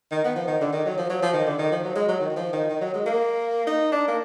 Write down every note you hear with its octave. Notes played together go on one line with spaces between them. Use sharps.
D#3
B3
F3
D#3
D3
D#3
F#3
F3
F#3
F3
D#3
D3
D#3
F3
F#3
G#3
F#3
D#3
D#3
F3
D#3
D#3
F#3
G#3
A#3
D#4
D4
A#3